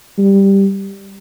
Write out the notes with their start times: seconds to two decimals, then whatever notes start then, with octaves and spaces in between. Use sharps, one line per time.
0.18 G3